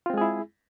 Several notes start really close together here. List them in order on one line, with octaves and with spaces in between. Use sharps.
F4 C4 G#3 G#4 E4